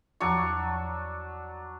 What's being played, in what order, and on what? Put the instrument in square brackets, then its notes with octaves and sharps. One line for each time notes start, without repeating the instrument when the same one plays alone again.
[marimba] E2 F3 D6 [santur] F#3 D4 C#6